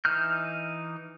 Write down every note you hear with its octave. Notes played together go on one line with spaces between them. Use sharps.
E3 D#4 F6 G6